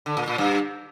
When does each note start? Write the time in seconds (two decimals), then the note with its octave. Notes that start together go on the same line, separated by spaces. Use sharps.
0.06 D3
0.17 A#2
0.28 A#2
0.38 G2